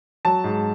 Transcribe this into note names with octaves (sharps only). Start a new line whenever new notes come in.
F#3 A5
G#2